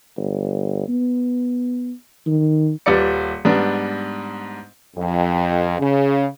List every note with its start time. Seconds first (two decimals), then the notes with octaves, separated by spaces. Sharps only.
0.17 G1
0.89 B3
2.27 D#3
2.86 D#1 G3 B4 D5 C#7
3.45 G#2 G3 B3 D4
4.96 F2
5.80 C#3